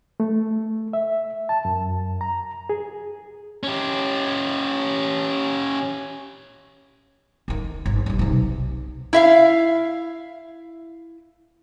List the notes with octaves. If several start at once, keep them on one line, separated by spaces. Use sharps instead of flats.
A3
E5
A5
F#2
A#5
G#4
C#4 G4
D2 D#3
G1
D#1 G3
B1 C3
E4 E5 F5